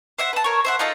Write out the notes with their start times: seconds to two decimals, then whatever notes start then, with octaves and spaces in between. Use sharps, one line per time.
0.18 C5 E5 F#5
0.33 B4 A5
0.44 A#4 C#5
0.65 C5 E5 F#5
0.79 D#4 F4 A4 D#5